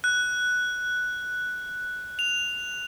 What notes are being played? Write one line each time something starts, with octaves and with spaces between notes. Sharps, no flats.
F#6
F7